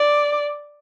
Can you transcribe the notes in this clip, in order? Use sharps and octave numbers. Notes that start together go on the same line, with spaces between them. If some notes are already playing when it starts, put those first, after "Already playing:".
Already playing: D5